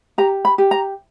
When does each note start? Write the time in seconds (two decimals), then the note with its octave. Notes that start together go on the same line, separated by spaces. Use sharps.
0.18 G4 A#5
0.45 B5
0.58 G4
0.71 A#5